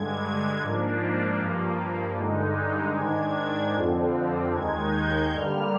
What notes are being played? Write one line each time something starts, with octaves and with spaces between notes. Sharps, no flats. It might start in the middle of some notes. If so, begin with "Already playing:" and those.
Already playing: G2 D3 G#3 G#6
G#2 F3 A#3 D4
G2 F3 A#3
G2 D3 G#3 D#4
G#2 D#3 G#3 D4 G#6
F2 D3 F3 C4
D#2 D#3 G#3 D#4 G#6
G6
G2 D3 G3 A#3 F6